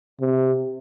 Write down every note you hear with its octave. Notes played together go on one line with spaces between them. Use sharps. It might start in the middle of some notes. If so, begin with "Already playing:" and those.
C3